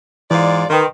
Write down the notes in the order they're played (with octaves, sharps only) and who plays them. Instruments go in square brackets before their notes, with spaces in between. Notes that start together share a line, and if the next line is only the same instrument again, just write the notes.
[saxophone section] G#2 F4 D5 [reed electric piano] E3
[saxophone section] D#3 [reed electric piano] B4 G5 C6